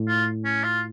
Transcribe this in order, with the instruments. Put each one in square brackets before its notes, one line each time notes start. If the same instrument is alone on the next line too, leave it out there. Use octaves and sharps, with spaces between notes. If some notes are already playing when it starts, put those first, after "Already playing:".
Already playing: [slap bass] A2
[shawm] F4
C#4
F4